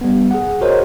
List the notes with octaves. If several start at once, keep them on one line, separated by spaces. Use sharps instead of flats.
G3 B3
G#4 F#5
F#4 G#4 A#4 C5 C#5 D#5